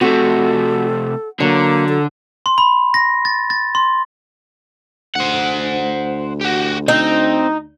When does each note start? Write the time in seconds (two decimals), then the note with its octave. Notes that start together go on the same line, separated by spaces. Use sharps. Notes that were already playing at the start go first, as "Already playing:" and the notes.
0.01 C3 A3 F#4 A4
1.40 D3 F#3 A#3
1.89 A4
2.46 C6
2.58 B5
2.94 A#6
3.25 A6
3.50 A6
3.75 C6
5.15 D2 C5 F#5
6.41 F#4 G4
6.88 C4 D#4